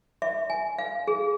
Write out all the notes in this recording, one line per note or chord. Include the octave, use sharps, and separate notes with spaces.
E5
G#5
F5
G#4